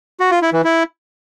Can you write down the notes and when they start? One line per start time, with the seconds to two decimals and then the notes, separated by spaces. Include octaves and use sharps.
0.20 F#4
0.31 F4
0.42 E4
0.53 E3
0.64 E4